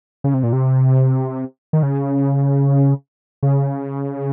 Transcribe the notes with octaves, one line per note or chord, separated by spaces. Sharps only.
C#3
C3
A#2
C3
D#3
C#3
C#3